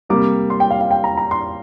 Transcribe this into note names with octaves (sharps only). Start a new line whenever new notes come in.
C3 G3 A#3 D6
C6
G5
F5
F5
G5
A#5
A#5
C6